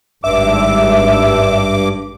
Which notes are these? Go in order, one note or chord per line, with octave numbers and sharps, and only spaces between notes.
G#1 G2 E5 D6